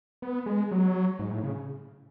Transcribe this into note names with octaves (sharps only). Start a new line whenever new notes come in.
B3
G#3
F#3
G#2
A2
C#3